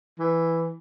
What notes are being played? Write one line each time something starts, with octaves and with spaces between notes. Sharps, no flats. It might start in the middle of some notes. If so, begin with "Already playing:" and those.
E3